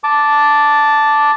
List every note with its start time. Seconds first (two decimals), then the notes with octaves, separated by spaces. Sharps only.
0.04 A5 D6